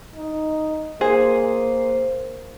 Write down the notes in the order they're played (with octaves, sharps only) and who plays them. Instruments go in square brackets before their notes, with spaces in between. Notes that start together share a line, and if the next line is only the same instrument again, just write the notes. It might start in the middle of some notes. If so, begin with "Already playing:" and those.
[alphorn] D#4
[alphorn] A#3 [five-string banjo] G#4 [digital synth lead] C5